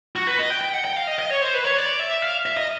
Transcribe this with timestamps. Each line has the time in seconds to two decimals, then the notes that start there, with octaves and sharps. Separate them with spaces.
0.16 F#4
0.27 B4
0.39 D#5
0.50 G5
0.61 G5
0.73 F#5
0.85 G5
0.96 F5
1.07 D#5
1.19 D#5
1.30 C#5
1.42 C5
1.54 B4
1.65 C#5
1.77 D5
1.99 E5
2.22 F5
2.46 E5
2.57 D#5